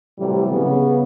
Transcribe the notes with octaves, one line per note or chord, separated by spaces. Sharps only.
A2 C3 E3 F#3 G3
C#3 B3